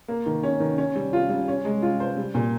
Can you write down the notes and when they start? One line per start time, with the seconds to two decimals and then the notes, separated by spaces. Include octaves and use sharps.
0.08 A#3
0.26 D#3
0.43 C#4
0.60 D#3
0.78 C#4
0.96 G3
1.13 F4
1.30 G3
1.48 C#4
1.65 G#3
1.82 F4
2.00 C5
2.17 G3
2.34 A#2